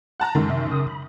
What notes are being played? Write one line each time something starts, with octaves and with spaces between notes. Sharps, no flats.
F#5 A5 A#5 F#6
F#2 D3 D#3 G#3
C3 E5
C#3 D#6
B5